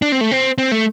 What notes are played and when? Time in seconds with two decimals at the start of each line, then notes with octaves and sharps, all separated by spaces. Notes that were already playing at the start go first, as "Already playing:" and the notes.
0.02 D4
0.12 C4
0.21 A3
0.31 C4
0.58 C4
0.72 A3